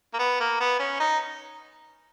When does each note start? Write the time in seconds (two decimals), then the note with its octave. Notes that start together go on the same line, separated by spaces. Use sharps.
0.14 A#3
0.19 B3
0.40 A#3
0.60 B3
0.79 C#4
1.00 D#4